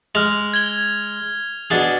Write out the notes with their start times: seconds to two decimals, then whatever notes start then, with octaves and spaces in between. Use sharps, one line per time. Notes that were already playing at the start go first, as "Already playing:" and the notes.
0.15 G#3 F6 F7
0.54 G#6 G7
1.70 B2 D4 G#4